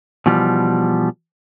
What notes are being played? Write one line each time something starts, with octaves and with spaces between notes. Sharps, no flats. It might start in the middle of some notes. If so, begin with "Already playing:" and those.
B2 E3 F3 G3